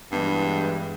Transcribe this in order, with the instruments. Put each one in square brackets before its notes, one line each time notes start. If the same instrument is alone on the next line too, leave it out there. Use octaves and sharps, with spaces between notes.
[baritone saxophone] G2 [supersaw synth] E3 G#3 B3